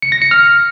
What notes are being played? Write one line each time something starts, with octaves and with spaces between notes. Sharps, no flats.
C#7
A#6
C#7
F6